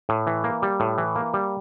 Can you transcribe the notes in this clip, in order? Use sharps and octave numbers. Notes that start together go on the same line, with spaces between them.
A2
E3
A#3
G3
A2
E3
A#3
G3